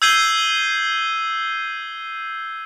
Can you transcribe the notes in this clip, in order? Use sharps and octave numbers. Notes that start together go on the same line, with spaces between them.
E6 G6 G#6 C7 D#7 G7